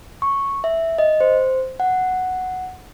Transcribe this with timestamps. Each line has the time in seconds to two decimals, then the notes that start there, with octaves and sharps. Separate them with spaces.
0.22 C#6
0.64 E5
0.98 D#5
1.20 C5
1.80 F#5